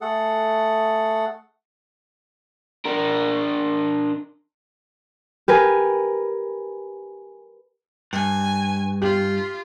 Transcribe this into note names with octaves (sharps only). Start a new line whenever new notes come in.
A3 G#4 A4 F#5
D4 A#4
G4 A#4 B4 G#5
G2 G#5
F4 G4